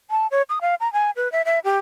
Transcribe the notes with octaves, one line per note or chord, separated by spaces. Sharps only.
A5
C#5
D#6
F5
A#5
G#5
B4
E5
E5
G4